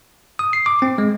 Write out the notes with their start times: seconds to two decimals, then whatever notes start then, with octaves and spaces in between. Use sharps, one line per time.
0.39 D#6
0.53 C7
0.66 D6
0.82 C4
0.98 G#3